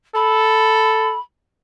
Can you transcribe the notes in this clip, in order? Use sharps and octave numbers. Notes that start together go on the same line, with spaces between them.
A4 B5